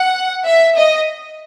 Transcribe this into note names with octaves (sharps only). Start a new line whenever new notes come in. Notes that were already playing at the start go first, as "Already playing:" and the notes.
Already playing: F#5
E5
D#5